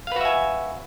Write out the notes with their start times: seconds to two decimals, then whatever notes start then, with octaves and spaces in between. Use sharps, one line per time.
0.07 F5
0.12 B4
0.16 F#4
0.21 E5
0.25 G#5